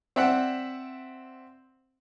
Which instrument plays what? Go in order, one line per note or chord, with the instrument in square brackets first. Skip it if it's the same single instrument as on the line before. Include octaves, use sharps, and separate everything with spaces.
[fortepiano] C4 D5 E5 F#5